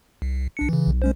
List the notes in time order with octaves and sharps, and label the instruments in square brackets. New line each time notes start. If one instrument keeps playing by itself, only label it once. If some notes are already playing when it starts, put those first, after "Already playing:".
[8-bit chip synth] C2
B1 D4 C#7
C#3 E3
[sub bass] B1
[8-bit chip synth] G#3 C#4 C5